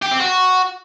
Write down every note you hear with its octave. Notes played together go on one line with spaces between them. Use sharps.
G4
C4
F#4